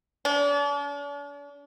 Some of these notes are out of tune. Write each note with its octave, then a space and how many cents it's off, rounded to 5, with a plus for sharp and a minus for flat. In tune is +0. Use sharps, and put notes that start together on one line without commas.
D4 -45